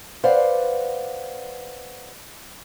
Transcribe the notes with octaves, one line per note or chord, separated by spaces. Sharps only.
B4 C5 D5 F5 F#5